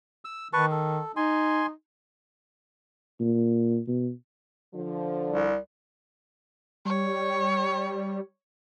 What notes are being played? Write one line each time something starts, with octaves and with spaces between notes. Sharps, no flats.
E6
D#3 B4 A5 C#6
A4
D#4 G#5 C6
A#2
B2
D3 F3
C2
G3 C#5